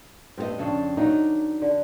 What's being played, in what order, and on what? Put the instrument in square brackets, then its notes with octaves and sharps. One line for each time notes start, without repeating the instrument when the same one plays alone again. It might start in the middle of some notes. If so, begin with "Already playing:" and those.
[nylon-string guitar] G2 G4 D#5 [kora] C4
[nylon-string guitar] F2 C#3 D4
[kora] D#3 F#3 [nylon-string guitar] D4 D#4
[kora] D3